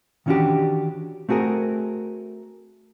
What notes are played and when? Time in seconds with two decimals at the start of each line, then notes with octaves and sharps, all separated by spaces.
0.26 D#3 E3 C#4 D4 F#4 G4
1.29 A3 C4 F#4 G#4 A#4